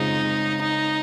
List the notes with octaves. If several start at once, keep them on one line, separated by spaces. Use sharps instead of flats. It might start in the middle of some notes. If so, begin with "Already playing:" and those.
Already playing: C#3 G#3 C4 D#4 F4 G#4
D#4